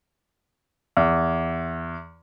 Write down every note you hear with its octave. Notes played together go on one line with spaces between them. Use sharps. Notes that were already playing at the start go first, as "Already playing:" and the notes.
E2